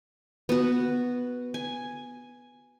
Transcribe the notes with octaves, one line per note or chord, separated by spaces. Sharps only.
B3 F#4
G#5